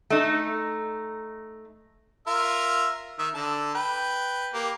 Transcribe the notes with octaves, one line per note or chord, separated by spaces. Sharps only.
A3 D#4
F4 A#4 E5
D#3 E5
D3 A5
B4 G5
A#3 G4